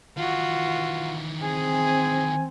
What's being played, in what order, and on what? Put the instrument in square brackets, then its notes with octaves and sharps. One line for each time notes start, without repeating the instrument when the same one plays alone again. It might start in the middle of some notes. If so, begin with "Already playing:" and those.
[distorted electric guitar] D#3 E3 [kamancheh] F4 F#4
[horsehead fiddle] C4 [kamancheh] G#4 [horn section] G#5